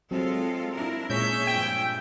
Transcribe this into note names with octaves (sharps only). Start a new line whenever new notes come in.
F#3 G#3 C4 F4 A4
D4 E4 A#4
A#2 G#3 C#4 G#4 C#5 E5 G6
G2 F3 G5